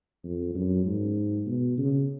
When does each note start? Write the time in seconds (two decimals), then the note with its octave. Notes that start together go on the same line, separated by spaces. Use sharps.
0.24 F2
0.55 F#2
0.85 G#2
1.46 B2
1.78 C#3